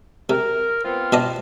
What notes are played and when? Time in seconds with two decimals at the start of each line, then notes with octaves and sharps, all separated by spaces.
0.30 C3 A#4
0.85 B3 C4 F4
1.12 B2 D4 D#5